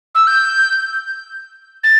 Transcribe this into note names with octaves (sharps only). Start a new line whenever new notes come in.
E6
G6
A6